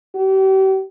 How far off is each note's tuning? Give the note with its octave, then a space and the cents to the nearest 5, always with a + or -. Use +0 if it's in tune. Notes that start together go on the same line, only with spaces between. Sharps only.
G4 -40